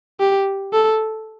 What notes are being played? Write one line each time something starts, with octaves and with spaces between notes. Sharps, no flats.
G4
A4